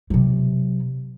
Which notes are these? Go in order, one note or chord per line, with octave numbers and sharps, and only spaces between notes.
C3 F#3